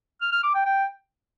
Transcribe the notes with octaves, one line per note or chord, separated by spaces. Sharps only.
F6
F6
D6
G5
G5